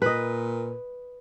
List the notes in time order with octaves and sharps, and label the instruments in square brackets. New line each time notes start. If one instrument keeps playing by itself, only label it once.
[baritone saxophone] A#2 [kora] B4 D#5